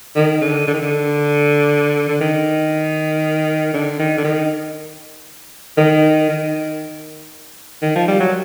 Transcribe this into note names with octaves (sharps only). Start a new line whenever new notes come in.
D#3
D3
D3
D#3
D3
D3
D#3
D3
D#3
D3
D#3
D#3
D#3
D#3
F3
G3
F#3